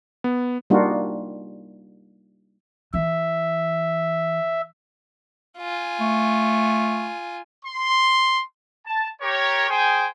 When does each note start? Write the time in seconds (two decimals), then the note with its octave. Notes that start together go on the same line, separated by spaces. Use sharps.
0.24 B3
0.70 G3 A#3 D4 D#4 F4 F#4
2.94 E3 E5
5.59 F4 G#5
6.00 A3
7.65 C6
8.86 A5
9.22 G4 A#4 C#5
9.69 G#4 C5 G5 G#5